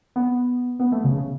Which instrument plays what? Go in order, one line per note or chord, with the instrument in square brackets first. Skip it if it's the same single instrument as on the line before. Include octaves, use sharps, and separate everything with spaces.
[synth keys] B3
B3
A3
C#3
C#3